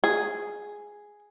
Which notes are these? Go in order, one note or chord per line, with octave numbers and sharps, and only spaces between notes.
G#4